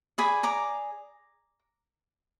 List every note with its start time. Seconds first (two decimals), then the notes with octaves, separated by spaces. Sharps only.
0.18 G#4 D5 G#5 B5
0.43 A#5 D6